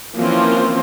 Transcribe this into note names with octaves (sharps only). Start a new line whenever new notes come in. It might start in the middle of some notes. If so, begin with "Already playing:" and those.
E3 F3 A#3 C4 C#4 F4